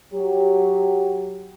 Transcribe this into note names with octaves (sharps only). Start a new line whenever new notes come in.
F#3 G4